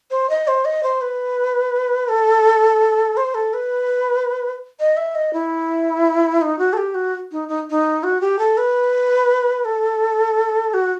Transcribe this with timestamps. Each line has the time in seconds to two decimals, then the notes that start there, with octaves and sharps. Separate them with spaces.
0.11 C5
0.30 D#5
0.48 C5
0.65 D#5
0.83 C5
1.01 B4
2.09 A4
3.17 C5
3.34 A4
3.54 B4
4.80 D#5
4.97 E5
5.15 D#5
5.33 E4
6.42 D#4
6.58 F#4
6.73 A4
6.77 G4
6.94 F#4
7.32 D#4
7.49 D#4
7.70 D#4
8.03 F#4
8.21 G4
8.39 A4
8.58 B4
9.65 A4
10.74 F#4